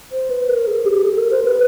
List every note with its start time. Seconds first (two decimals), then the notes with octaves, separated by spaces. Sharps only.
0.12 C5
0.30 B4
0.48 A#4
0.67 G#4
0.85 G4
1.03 A4
1.17 A#4
1.31 C5
1.45 B4